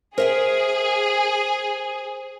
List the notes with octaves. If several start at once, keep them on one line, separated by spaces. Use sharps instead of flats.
G#4 A#4 C5 E5 G5